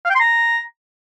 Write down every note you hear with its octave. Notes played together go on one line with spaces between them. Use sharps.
F5
G5
C6
A#5